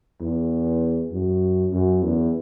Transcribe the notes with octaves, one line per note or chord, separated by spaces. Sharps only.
E2
F#2
F#2
E2